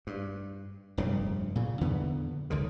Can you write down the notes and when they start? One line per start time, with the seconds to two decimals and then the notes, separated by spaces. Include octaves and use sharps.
0.07 G2
0.97 F1 G2 A#2 C#3
1.55 A#2 C#3
1.81 E2 D3 E3 B3
2.50 C#2 D3 D#3